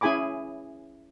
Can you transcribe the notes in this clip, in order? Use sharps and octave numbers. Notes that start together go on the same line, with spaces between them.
C#4 E4 G#4 G#5 B5 D6